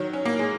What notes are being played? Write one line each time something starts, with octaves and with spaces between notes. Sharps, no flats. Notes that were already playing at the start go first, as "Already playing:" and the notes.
Already playing: D#3 F#3
C#4
A#3
G#3